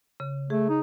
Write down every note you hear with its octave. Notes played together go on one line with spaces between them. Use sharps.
C#3
A3 G#4
D#4